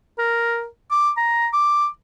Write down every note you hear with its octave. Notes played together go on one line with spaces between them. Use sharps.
A#4
D6
A#5
D6